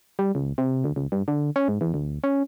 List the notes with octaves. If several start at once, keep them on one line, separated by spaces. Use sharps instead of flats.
G3
C#2
C3
D2
C#2
G2
D3
C#4
G#2
E2
D2
C#4